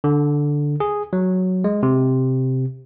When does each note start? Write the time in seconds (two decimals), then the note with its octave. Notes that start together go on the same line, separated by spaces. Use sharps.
0.04 D3
0.80 G#4
1.13 F#3
1.64 G#3
1.83 C3